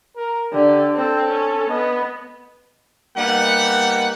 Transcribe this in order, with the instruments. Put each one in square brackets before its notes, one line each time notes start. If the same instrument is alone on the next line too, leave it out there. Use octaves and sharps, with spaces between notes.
[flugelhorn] A#4
[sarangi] D3 [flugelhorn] G4
[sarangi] C4 [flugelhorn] A4
[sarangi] C#4
[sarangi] B3 [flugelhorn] D#5
[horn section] G3 A#3 B3 D#4 F#5